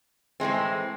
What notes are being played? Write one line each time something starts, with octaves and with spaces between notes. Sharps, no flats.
A2 E3 G#3 C4